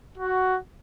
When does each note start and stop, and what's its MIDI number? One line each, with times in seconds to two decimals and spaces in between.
0.18 0.56 66